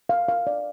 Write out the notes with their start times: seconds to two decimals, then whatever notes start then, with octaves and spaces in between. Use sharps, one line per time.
0.09 F5
0.28 F5
0.47 D5